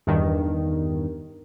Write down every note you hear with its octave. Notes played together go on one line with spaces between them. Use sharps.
E2 G2 D#3